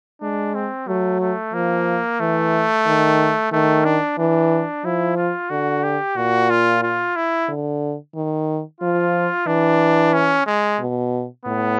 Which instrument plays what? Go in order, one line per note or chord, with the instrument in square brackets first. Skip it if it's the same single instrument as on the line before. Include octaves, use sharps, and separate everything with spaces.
[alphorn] G#3 [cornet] D4
[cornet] C4
[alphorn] F#3 [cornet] A3
[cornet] A3
[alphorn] F3 [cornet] A#3
[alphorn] E3 [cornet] A3
[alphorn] D#3
[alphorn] D#3 [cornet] A3
[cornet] D4
[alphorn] E3 [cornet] D4
[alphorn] F3 [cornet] E4
[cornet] F4
[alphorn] D3 [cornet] F#4
[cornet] G4
[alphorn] A#2 [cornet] F#4
[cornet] F4
F4
E4
[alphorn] D3
D#3
[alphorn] F3 [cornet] F4
[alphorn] E3 [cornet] D4
[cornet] C#4
G#3
[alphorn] B2
[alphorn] A2 [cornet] B3